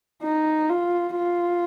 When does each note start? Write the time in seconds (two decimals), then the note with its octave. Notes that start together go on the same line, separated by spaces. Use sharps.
0.23 D#4
0.70 F4
1.16 F4